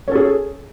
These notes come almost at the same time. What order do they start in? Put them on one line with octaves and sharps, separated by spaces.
C#4 A4 G#4